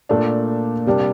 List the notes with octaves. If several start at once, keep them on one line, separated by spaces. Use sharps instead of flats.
A#2 A3 D4
C3 G3 A#3 D4